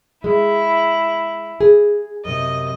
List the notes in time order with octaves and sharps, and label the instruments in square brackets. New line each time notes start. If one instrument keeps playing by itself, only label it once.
[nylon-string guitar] G#3 [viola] E4
[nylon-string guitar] G#4
[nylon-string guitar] F#2 C3 [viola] D#5